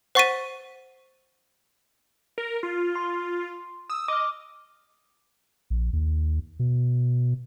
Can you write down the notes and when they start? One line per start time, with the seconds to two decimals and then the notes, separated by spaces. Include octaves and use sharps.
0.15 C5 F#5 C#6 A6 B6 D#7
2.38 A#4
2.63 F4
2.96 C6
3.90 D#6 E6
4.08 D#5 D6 F6
5.70 A#1
5.93 D#2
6.59 B2